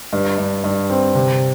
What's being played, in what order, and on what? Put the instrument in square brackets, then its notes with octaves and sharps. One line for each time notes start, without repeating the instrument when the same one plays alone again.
[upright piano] G2
G2
G2
C4
C3